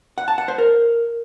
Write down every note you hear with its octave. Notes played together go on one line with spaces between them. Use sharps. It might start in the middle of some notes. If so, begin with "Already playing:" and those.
F#5
A5
F#5
C5
A#4